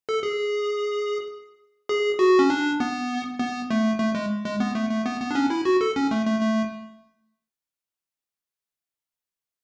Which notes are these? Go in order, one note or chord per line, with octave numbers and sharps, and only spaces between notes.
A4
G#4
G#4
F#4
C#4
D4
B3
B3
A3
A3
G#3
G#3
B3
A3
A3
B3
B3
D4
C#4
E4
F#4
A4
C#4
A3
A3
A3